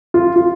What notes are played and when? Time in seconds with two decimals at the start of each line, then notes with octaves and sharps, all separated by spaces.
0.14 F4
0.36 F4